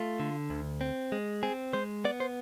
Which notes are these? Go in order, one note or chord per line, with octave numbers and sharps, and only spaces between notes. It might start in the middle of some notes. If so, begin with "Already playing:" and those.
Already playing: A3 F4
D3
D2
C4
G#3
C4 G#4
G#3 C5
B3 D5
C5